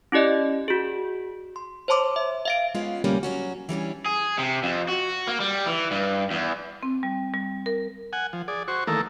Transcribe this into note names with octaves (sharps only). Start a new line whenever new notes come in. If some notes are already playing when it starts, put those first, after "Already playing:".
C#4 E4 G4 D5 D#5
F#4 G#4
C6
C5 C#5 A5 C6 D6
E5
E5 F5 D7
G#3 B3 C#4 F4
D2 C3 G3 A#3 C#4
F#3 C#4 F#4
E3 G3 C#4 D4
G#4
C3
F2
F#4
A#3
G3
E3
G2
E2
C4
G3
G3
A#4
F#5 G#5
F3
G#4 D5
F#4 C5 C#6
D#3 E3 A3 A#3 A4 A#4